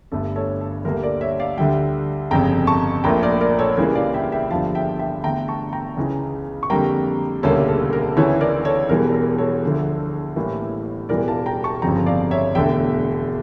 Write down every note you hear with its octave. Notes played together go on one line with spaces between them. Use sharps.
G1 G2 D3 A3 A4
A4 C#5
A4
D2 D3 G3 A#3 A#4
A#4 D5
C#5 E5
D5 F5
D2 D3 G3 E5 G5
G1 F2 C#3 G5 A#5
A5 C#6
A#1 A#2 A3 G5 A#5
A#4 D5
A#4 D5
A4 C#5
C#2 C#3 E3 G3 A#3 A#4
D5 F5
E5 G5
E5 G5
G1 G2 F3 F5 A5
E5 G5
E5 G5
E2 D3 A3 G5 A#5
A5 C#6
G5 A#5
C#2 C#3 E3
C#6
F2 D3 G3 A#3 G5 A#5
E1 D2 C#3 G3 A#3 A4 C#5
A4
A#4
D2 C#3 E3 A4 C#5
A#4 D5
A4 C#5
E1 E2 E3 G3 A#4
A#4
A4 C#5
D2 D3 F3
A1 A2 E3 G3 A#3
E1 E2 E3 G3 A#4 D5
F5 A5
G5 A#5
A5 C#6
G1 F2 C#3 F3 G5 A#5
D5 F5
C#5 E5
E1 E2 D3 A3 E5 G5